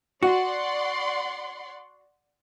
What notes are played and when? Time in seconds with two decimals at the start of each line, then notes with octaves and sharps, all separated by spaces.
0.23 F#4 D5 F#5 C6